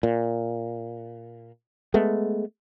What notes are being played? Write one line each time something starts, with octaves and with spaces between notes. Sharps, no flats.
A#2
G#3 A3 B3